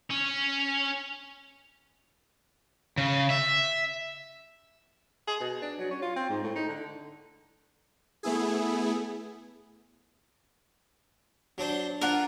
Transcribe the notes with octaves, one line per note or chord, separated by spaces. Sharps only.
C#4
C#3
E5
G#4
B2
D4
F#3
C#4
F4
C4
G#2
A2
D#4
D3
A3 B3 E4 G#4
F#3 D4 C5
D4 F4 A#4 F#5